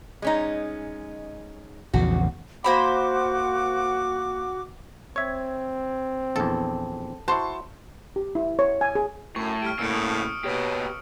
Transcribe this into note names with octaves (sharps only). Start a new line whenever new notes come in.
G#3 C#4 D#4
A#1 E2 C#3 F#4
A#3 F#4 C5 F#5 B5 D6
C4 C#5 E5 G#6
A#1 E2 A4
E4 F#4 C5 A5 C6 C#6
G4
E4
C#5
G#5
G#4
F#2 A2 C#6
G3 F6 D7
A2 C#3 A#3 E6 C#7 D7
D#6
B2 G4 C#5